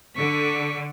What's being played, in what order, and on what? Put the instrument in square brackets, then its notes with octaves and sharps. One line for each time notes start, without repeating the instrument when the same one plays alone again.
[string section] D3 [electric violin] C#6 B6